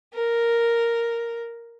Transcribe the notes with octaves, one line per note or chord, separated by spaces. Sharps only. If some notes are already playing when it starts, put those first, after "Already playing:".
A#4